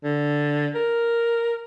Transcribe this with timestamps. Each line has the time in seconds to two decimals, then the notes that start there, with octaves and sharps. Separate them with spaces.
0.05 D3
0.75 A#4